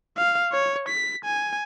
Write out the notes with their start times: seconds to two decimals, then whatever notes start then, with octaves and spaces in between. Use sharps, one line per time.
0.17 F5
0.52 C#5
0.88 B6
1.25 G#5